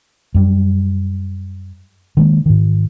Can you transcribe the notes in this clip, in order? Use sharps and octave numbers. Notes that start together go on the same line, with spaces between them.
F#2 G3
D#3 G#3 A#3
G#2 D#3